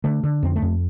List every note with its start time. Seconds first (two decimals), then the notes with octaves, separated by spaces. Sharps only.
0.04 D3 A3
0.24 D3
0.43 F2 C4
0.56 A3
0.62 F2